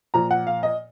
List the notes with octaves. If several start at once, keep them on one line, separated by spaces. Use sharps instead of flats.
A#2 F3 A#5
F#5
F5
D#5